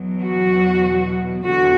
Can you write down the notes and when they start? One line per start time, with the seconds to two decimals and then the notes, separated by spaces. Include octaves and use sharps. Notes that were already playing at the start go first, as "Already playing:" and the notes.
Already playing: E2 B2 F#3
0.22 F#4
1.47 E2 D3 F#4